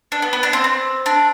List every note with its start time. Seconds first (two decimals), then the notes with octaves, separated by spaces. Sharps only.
0.12 D4
0.22 B3
0.33 B3
0.43 D4
0.53 C4
0.64 C4
1.06 D4